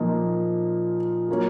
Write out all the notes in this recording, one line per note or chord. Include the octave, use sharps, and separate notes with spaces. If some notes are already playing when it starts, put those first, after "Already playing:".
Already playing: A#2 F3 A#3 D#4
F#3 A#3 C#4